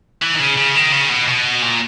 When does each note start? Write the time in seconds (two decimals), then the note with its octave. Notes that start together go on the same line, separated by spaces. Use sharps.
0.22 E3
0.34 D#3
0.39 C#3
0.57 C#3
0.75 D#3
0.92 C#3
1.10 B2
1.28 B2
1.62 A#2